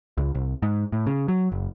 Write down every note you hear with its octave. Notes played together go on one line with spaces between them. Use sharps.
C#2
C2
G#2
A2
C#3
F#3
F#1